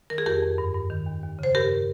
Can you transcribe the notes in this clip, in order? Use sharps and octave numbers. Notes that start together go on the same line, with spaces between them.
D#3 A#4
G#4
F2 G4 A#4
F2
G2
G2
D#3
D#2
D#2
C#3 C5
G2 G4 A#4